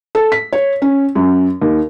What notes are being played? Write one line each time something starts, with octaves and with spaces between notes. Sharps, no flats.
A4
B6
C#5
C#4
F#2
D#2